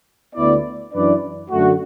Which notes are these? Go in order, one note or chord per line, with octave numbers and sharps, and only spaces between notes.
D2 D3 B3 E4 D5
F#2 E3 D4 B4 D5
F#2 D3 A3 F#4